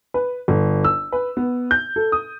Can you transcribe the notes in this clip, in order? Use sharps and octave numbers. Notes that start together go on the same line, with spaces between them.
B4
G1
E6
B4
B3
G6
A4
D#6